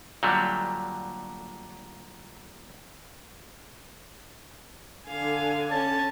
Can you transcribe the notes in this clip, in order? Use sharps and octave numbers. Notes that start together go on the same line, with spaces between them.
A#2 D3 F#3 G3 A3
D3 F5 G#5
C#4 A5